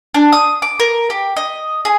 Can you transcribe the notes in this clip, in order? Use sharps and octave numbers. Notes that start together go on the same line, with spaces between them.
D4
D#6
D6
A#4
G4
D#5
G#4